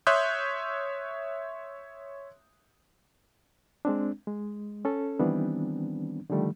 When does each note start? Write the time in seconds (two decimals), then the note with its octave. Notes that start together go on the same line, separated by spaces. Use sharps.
0.07 C#5 E5 C6 D#6 F#6 G6
3.85 G#3 C4 D4
4.27 G#3
4.85 C#4 A4
5.20 D#3 E3 G3 B3 C4 D4
6.30 D3 D#3 F3 G3 A3